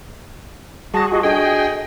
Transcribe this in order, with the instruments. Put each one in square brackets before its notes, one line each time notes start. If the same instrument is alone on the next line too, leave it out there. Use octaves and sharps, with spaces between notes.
[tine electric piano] G3 F#5 A#6 [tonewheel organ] F#4 G#4 [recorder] A5
[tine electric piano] F4 G4 [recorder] D#5
[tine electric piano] D4 F#4 A4 [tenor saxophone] G#4 [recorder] D#5 [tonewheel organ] G5